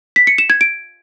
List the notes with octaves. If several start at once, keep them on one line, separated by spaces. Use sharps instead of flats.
B6
C#7
E7
G#6
D7